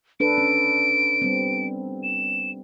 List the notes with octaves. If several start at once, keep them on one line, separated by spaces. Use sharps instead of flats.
D4 A4 B4 D7
C#4
G3 B3 C4
E7